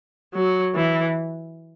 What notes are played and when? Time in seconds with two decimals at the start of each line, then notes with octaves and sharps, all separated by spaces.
0.34 F#3
0.75 E3